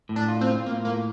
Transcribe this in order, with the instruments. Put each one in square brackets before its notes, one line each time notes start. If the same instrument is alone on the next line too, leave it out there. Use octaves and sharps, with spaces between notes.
[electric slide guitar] A2
[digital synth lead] D4
[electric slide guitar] F4
[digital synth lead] C4
[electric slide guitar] F4
[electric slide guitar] A2 [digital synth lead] A#3
[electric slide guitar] A2 [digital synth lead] A#3